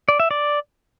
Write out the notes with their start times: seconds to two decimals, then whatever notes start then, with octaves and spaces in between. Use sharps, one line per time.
0.09 D5
0.20 E5
0.31 D5